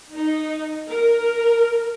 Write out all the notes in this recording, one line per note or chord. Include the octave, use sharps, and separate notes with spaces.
D#4
A#4